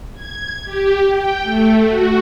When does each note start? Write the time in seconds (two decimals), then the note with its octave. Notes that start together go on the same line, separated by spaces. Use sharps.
0.15 G#6
0.64 G4
1.09 G5
1.43 A3
1.84 F#4